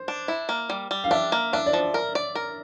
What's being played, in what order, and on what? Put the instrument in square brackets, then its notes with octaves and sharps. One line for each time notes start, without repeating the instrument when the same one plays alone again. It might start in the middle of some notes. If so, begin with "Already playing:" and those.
Already playing: [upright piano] C5
[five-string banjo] D4
E4
A#3
G3
G3
[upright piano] F5
[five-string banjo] D4 [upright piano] E5
[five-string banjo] A#3
[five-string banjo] D4 [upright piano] E5
[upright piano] D5
[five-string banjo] F3
A#4
D5
A#4